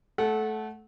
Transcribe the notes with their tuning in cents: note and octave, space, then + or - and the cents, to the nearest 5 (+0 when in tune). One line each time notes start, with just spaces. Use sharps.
A3 -20 A4 -15 F#5 +0